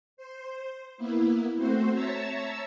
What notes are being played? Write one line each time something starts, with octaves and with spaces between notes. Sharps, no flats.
C5
A#3 B3 E4
A3 C4 F#4 C5
C#5 E5 A5 A#5 E6